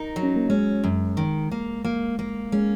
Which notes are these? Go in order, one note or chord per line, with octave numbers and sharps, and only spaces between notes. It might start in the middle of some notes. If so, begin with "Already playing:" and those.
Already playing: D#4 A#4
F#3
C#4
A#3
G#3 C#4
F#2
D#3
A#3
A#3
A#3
G#3 C#4